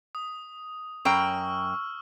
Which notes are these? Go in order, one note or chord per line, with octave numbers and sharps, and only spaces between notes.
D#6
F#2 G5 A#5 C#6 E6 F6